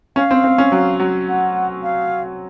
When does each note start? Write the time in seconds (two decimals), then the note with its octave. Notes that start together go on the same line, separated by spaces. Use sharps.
0.16 C#4 F5
0.31 C4
0.44 C4
0.58 C#4
0.72 F#3
1.00 F#3
1.28 F#5
1.83 F5